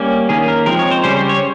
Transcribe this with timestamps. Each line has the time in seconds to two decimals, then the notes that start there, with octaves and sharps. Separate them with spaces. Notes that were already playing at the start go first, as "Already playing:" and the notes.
Already playing: G3 A#3 C#4
0.29 D#3 A#3 C#4 G#4
0.48 A#4
0.66 F3 G#3 C4 A#4
0.79 C#5
0.91 C5
1.04 C#3 G3 C#4 C5
1.16 C5
1.29 C#5